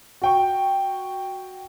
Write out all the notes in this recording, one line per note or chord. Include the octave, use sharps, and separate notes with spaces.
F#4 G5 C#6